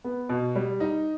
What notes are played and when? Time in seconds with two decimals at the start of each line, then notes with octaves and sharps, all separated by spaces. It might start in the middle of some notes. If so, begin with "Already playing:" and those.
0.04 B3
0.29 B2
0.55 G3
0.80 D#4